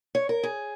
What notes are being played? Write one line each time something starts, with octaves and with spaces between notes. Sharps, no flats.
C#5
A#4
G#4